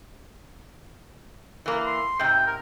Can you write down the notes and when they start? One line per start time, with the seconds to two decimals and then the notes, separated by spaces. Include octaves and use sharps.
1.66 E3 A#3
1.86 C6
2.19 G#2 C3 G5
2.47 A#4